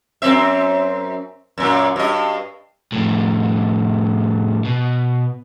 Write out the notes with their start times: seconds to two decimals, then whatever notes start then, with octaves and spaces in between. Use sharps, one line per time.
0.22 F#2 C4 E5
1.58 F#2 A#2
1.96 G2 D#5
2.92 F2 A2
4.65 B2